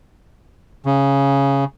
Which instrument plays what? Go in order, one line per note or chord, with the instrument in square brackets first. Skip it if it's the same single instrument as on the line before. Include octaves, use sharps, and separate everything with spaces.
[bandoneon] C#3